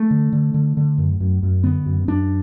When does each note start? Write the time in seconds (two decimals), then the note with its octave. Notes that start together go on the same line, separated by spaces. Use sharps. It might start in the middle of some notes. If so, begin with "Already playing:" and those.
Already playing: A3
0.11 D3
0.33 D3
0.54 D3
0.77 D3
0.98 F#2
1.20 F#2
1.43 F#2
1.64 D3 B3
1.86 F#2
2.08 F#2 D4